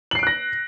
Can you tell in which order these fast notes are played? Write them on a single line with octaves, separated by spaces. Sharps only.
F#7 C7 D7 F#6 A#6